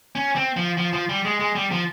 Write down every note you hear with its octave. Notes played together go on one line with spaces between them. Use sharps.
C#4
C4
F3
F3
F3
G3
G#3
G#3
G3
F3